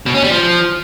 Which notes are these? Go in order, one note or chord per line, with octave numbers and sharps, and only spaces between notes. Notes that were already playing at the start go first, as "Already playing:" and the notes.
B2
C#4
G3
F3